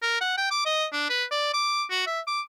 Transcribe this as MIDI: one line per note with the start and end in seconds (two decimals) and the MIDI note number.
0.02 0.18 70
0.21 0.37 78
0.38 0.49 79
0.51 0.64 86
0.66 0.86 75
0.93 1.09 62
1.10 1.25 71
1.31 1.53 74
1.54 1.85 86
1.90 2.05 66
2.07 2.21 76
2.27 2.41 86